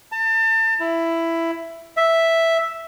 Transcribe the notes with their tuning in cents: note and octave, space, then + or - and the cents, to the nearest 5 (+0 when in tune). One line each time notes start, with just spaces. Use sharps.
A5 +35
E4 +10
E5 +0